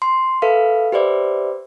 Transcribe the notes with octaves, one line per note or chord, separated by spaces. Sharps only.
C6
A4 B4 E5 F5
G4 B4 C5 D5 E5